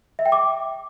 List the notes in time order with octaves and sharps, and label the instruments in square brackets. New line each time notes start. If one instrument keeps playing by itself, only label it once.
[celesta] E5
G5
D6